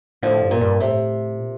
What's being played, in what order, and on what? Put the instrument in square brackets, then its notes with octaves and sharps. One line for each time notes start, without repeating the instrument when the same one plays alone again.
[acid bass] A2 [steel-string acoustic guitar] D3 F3
[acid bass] G2
[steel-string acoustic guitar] A#2
[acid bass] G2
[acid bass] A2 [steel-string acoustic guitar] C3
[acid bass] A#2